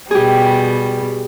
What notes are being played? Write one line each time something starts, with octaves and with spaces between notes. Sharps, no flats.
B2 G3 G4 G#4